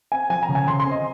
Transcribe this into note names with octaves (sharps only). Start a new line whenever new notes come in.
C4 G#5
F3 G#5
A#5
C#3
G#5
C#3 C6
C6
C4
D#5